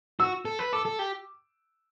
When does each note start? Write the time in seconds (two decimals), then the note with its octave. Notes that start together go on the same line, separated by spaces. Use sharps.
0.20 F#4 E6
0.45 A4
0.59 B4
0.73 A4 D6
0.85 A4
0.99 G4